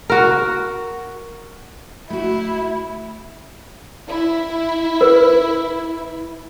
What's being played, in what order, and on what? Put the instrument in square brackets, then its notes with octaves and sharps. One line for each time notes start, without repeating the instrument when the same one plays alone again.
[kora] F#4 A#4
[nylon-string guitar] A3 F#4 [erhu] E4
[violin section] E4
[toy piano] A#4 B4